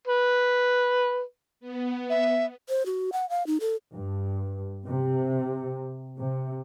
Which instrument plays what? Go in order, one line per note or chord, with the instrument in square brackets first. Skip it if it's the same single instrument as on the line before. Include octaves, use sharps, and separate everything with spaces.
[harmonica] B4
[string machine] B3
[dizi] E5
[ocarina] C5
F#4
F#5
F5
D#4
A4
[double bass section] G2
C3
C3